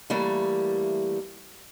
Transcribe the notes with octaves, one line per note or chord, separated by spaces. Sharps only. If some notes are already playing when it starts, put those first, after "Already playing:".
E3 G3 A3 A#3